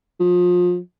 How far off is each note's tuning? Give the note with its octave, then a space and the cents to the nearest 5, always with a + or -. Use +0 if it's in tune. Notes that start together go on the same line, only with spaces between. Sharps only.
F3 +30